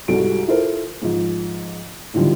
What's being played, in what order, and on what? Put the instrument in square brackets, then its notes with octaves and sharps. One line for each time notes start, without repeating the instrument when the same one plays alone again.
[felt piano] C2 G#2 G3 F#4 A4 D7
E4 F4 A4 A#4 C5
G#2 F3
A2 D3 D#3 F3 G3